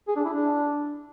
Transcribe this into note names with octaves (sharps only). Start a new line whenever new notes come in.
G#4
D4
E4
D4